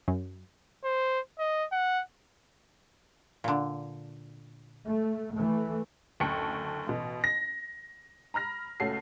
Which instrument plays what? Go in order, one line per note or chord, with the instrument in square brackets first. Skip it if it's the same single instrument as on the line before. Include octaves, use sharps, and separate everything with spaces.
[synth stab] F#2
[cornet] C5
D#5
F#5
[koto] A#2 D3
[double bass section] A3
E3 A3
[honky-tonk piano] F#1 D2 A4 G5 C#6 C#7
A1 B2
A#6
A#5 B5 F6 A#6
C#2 A3 C#4 F#4 A5 C7